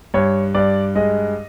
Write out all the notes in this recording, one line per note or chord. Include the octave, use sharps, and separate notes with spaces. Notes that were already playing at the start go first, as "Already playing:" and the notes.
G2 C#5
G2 D5
G#3 D#5